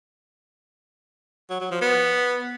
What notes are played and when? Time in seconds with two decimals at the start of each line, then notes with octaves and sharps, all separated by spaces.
1.50 F#3
1.60 F#3
1.71 F3
1.82 B3